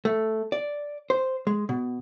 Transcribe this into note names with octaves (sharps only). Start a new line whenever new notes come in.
A3
D5
C5
G#3
B2